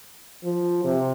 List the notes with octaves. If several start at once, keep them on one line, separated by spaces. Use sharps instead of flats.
F3
C3